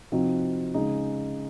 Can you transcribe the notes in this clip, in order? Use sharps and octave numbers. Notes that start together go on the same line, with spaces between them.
C3 F3 C4 D#4 F#4
C#3 G#3 D#4